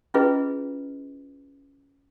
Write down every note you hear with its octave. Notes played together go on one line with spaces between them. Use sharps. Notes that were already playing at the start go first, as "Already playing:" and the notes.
C#4 E4 F4 G#4 B4 D#5